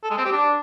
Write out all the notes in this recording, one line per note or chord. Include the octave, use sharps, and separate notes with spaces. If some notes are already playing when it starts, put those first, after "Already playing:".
A4
G#3
C4
G4
D4